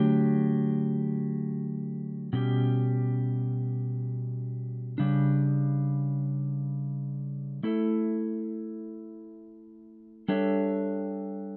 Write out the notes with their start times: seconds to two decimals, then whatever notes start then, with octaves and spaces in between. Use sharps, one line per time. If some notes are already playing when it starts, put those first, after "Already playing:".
Already playing: D3 F#3 A3 D4 G4
2.33 B2 G3 C#4 G4
4.98 C#3 G3 D4
7.63 A3 E4 A4
10.28 G3 D4 A4 C#5 E5